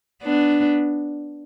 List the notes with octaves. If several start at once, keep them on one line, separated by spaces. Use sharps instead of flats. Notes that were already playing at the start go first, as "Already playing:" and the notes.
B3 D4